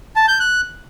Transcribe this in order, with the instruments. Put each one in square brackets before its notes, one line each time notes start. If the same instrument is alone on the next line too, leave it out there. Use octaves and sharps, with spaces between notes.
[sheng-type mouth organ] A5
G6
F#6